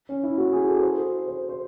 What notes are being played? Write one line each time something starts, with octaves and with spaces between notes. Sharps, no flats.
C#4
E4
F#4
G#4
A4
C5
C5
C5